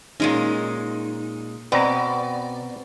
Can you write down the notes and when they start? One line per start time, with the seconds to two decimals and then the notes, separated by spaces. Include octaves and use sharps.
0.20 A#2 G#3 C#4 D#4
1.72 B2 B3 C4 D5 A#5